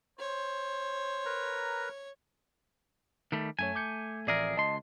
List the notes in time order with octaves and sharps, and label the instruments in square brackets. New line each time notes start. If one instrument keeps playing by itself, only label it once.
[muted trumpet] C5 [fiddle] C#5
[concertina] A#4 B4 A#5
[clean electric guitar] D#3 G3 A3
[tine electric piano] F#2 C#5 [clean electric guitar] A3 G#5
[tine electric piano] D6 G6 C#7
[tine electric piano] A1 D5 E5 [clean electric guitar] F2 G#4 A#4
[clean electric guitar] C#2 C6 [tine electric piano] D#5 A5